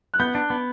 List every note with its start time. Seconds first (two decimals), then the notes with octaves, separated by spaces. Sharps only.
0.14 F#6
0.20 B3 G6
0.35 D4
0.50 B3